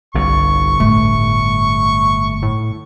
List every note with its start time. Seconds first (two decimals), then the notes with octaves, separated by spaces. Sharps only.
0.15 G1 C2 G2 C#6
0.80 A2 A3
2.42 A2